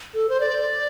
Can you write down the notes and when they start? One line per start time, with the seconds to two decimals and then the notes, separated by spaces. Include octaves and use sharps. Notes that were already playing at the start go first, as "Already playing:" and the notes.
0.14 A4
0.29 C5
0.40 D5